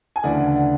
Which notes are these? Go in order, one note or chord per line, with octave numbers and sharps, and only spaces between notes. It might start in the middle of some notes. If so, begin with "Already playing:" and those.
G#5
D2 C#3 E3 D5 F#5
D5 F#5